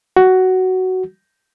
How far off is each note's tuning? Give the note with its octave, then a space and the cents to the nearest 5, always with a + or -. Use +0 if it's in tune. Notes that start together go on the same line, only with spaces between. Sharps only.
F#4 +10